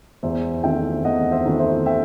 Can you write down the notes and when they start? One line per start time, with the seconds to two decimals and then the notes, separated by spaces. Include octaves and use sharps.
0.23 E2 C5 E5
0.63 D#3 A3 C4 E5 G5
1.05 E2 D#5 F#5
1.32 C5 E5
1.45 D#3 A3 C4
1.59 C5 E5
1.86 E5 G5